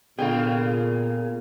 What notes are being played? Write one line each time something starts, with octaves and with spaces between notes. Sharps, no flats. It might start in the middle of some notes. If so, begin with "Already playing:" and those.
A#2 D3 B3 F4 G#4 F5 G5